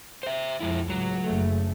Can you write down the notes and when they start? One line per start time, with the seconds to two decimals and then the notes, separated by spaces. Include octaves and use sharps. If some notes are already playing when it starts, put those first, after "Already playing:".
0.23 C5 E5
0.61 F2 G#3 E4
0.90 C#2 A2 F#3
1.24 F#1 C#3 A3